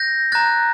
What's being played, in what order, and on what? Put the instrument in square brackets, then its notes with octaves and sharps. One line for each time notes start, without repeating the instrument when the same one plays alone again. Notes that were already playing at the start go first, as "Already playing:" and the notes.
Already playing: [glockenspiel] G6 A#6
A#5 F#6 A6